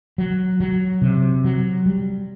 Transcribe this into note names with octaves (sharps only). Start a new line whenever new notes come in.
F#3
F#3
C3
F#3
G3